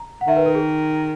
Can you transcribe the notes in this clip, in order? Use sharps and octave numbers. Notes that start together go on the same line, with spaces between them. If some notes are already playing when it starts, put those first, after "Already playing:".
Already playing: A#5
F#5
D#3 E5
B4
A#4
G#4